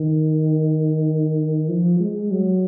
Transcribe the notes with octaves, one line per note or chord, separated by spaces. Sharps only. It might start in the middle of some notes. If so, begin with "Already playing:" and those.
Already playing: D#3
F3
G#3
F#3